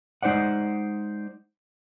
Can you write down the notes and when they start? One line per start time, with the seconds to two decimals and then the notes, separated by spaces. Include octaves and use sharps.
0.22 G#3 D#4 C5 D5 F#5